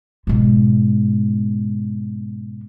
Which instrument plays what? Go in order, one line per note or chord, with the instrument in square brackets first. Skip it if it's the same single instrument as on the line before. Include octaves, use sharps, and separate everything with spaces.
[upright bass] G#2 B2